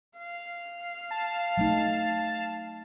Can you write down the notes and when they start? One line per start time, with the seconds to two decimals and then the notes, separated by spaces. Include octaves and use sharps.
0.18 F5
1.11 A5
1.57 F#3 A3 D#4